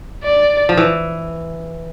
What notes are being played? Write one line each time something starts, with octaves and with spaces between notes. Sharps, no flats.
D5
F3
E3